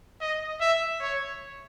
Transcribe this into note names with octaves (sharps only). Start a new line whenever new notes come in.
D#5
E5
C#5